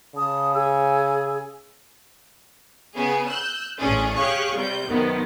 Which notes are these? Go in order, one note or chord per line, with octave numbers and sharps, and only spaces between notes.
C#3 A5 D#6
G#4 E6
C#3 B3 G#4
E6 F#6 G6
A1 C#4 D4 G#4
G4 G#4 C#5 F5 C#6 F#6
C3 G3 G6
F#2 C3 D#3 B3